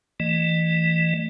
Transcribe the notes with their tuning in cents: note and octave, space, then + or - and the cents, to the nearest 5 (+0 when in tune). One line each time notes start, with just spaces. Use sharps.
E3 +0 A3 +30 D#5 -30